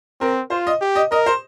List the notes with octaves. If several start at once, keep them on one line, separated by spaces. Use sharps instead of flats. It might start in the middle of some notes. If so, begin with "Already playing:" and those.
C4 A#4
F4 C5
D#5
G4
D#5
A#4 D#5
C5